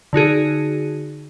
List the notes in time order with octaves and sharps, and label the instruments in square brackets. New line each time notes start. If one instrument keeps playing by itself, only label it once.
[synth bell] D3 D#4 F#4 G#4